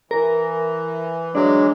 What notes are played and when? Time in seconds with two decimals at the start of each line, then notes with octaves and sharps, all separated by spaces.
0.11 E3 A#4
1.35 F#3 G#3 D4